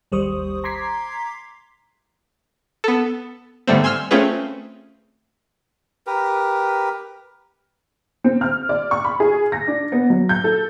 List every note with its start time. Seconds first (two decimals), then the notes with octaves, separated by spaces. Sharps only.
0.12 G#1 D#2 G3 C5 C#6 D#6
0.64 A#5 C6 D6 G#6 B6 C7
2.84 B3 A4
3.67 G#2 D3 G3 A3 B3 C4
3.84 G#5 C6 E6 F6
4.11 A3 C4 C#4 F4 G#4 B4
6.07 G4 A#4 B4
8.24 C4
8.41 F6
8.69 D5
8.91 C#6
9.05 B5
9.20 G#4
9.52 A#6
9.68 D4
9.92 B3
10.10 F#3
10.29 G6
10.44 A4